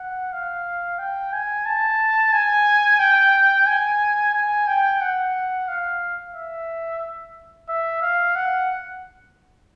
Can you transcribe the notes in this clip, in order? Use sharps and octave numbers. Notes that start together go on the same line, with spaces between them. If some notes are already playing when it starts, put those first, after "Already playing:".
Already playing: F#5
F5
G5
G#5
A5
G#5
G5
G#5
G#5
G5
F#5
F5
E5
E5
F5
F#5